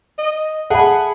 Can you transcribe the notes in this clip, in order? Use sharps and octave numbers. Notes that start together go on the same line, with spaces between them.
D#5
G#4 A4 E5 F#5 A5 B5